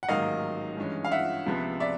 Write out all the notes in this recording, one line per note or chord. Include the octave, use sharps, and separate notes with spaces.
F#5
A1 G#2 D#3 F#3 A#3 D#5 F5
G2 E3 G#3 C#4
F5
E5 F#5
C#2 C3 F3 G#3 B3
D5 E5